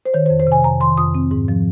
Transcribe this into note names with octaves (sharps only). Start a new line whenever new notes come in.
C5
D#3 C#5
C5
F2
C5
C3 G#5
F2 A#5
D#3 C6
F2 D#6
C4
G#2
F3